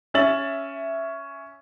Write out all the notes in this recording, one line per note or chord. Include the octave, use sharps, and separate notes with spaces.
C#4 E5 A6 F#7